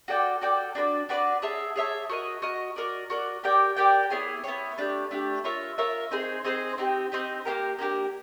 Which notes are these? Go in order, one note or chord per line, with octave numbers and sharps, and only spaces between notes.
F#4 A4 D5 G5
F#4 A4 D5 G5
D4 F#4 B4 D5
D4 F#4 B4 D5
G#4 C#5 E5 A5
G#4 C#5 E5 A5
F#4 A#4 D#5
F#4 A#4 D#5
F#4 A#4 D5
F#4 A#4 D5
G4 A#4 D5 G5
G4 A#4 D5 G5
B3 E4 G#4 C#5
B3 E4 G#4 C#5
A3 D4 G4
A3 D4 G4
F4 A#4 C#5 E5
F4 A#4 C#5 E5
C4 D#4 G#4 C5
C4 D#4 G#4 C5
C4 D#4 G4
C4 D#4 G4
A#3 D4 G4 A#4
A#3 D4 G4 A#4